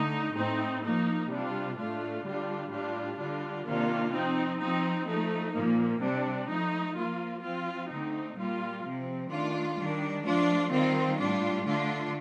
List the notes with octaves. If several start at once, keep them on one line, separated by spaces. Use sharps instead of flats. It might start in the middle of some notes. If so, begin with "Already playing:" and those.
Already playing: D3 A3 D#4
A2 A3 C4 D#4
F3 A#3 D#4
C3 G3 D4 F4
A2 A3 D4 F4
D3 G3 D4 F4
A2 G3 D4 F4
D3 G3 D4 F4
C3 D#3 A#3 D4 F4
F3 C4 D#4
F3 C4 D#4
F3 A3 D#4
A#2 F3 A#3
C3 G3 D4
F3 A3 D#4
F3 A#3 F4
F3 C4 F4
D3 A3 C4 D#4
A#2 G3 A#3 F4
C3 F3 C4
D#3 A3 D4 F4
D#3 G3 D4
F3 A3 D4 F4
D#3 G3 C4 F4
A2 G3 D4 F4
D3 A3 D4 F4